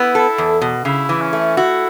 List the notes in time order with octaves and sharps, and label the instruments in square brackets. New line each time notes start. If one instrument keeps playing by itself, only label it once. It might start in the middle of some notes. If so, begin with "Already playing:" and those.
Already playing: [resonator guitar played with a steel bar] B3 [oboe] E4
[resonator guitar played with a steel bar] A4
E2
B2
[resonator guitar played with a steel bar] C#3 [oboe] E4
[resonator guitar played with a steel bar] E3
[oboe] C#4
[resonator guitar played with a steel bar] A3
[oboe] E4 [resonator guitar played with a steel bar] F#4